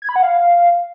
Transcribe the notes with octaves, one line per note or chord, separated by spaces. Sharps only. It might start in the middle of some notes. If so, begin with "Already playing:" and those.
G#6
B5
F#5
F5